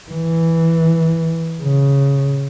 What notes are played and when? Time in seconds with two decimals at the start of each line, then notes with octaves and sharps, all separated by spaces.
0.11 E3
1.62 C#3